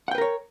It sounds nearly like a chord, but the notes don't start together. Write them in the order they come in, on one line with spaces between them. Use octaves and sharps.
F#5 G5 B4 A#4 C#5